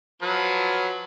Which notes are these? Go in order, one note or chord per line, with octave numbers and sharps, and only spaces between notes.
F3 F#3 B4